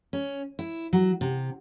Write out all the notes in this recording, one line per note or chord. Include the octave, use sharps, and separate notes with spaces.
C#4
E4
F#3
C3